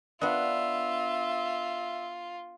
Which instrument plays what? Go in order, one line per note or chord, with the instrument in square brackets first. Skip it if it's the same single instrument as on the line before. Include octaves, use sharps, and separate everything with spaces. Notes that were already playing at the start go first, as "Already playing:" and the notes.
[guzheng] B3 D4 [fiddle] F4 [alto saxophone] E5